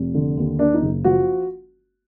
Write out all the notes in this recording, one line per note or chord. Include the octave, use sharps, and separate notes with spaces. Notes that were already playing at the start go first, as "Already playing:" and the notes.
Already playing: F1
D3
D#2
A#3 D4
D#4
F#1
F3 F#4